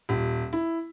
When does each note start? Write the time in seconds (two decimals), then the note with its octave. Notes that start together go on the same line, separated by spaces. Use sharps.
0.09 D#1
0.53 E4